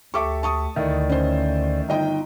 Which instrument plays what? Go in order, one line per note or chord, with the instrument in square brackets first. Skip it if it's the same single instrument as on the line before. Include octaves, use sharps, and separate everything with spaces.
[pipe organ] D2 [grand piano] G4 A4 E5 [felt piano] C#6 D6
[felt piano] A5 C#6 D#6
[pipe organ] D2 D3 D5 [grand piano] D#3 A3 E4
[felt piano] C#4 C5
[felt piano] G1 D#5 G5 [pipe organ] D#4